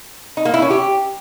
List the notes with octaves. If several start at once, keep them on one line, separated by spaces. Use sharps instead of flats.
D#4
A#3
E4
C#4
G4